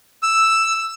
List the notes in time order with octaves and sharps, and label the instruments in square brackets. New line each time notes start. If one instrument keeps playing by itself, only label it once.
[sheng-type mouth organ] E6